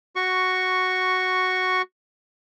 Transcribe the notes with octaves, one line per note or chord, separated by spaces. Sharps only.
F#4 C#6